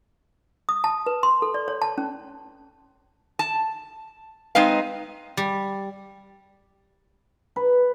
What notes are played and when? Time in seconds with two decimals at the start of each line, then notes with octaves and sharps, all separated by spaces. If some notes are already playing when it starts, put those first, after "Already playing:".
0.69 D#6
0.84 A5
1.06 B4
1.23 C6
1.42 A4
1.54 D5
1.68 C#5
1.82 A5
1.98 C#4
3.39 A5
4.55 G#3 C4 D#4 B4 F5
5.37 G3
7.56 B4